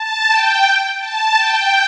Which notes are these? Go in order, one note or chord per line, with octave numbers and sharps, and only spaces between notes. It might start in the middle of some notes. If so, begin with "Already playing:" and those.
Already playing: A5
G5
A5
G5